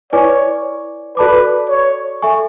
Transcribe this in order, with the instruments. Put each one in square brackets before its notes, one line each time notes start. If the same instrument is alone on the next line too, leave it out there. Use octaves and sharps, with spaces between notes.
[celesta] E4 B4 D5 G#5 D6 [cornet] C#5
[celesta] F#4 A4 D5 A5 D6 [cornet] B4
[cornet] C#5
[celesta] A4 E5 G#5 C#6